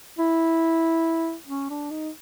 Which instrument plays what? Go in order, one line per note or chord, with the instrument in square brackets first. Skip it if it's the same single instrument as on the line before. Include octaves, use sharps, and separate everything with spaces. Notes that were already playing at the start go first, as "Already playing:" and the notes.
[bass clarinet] E4
C#4
D4
D#4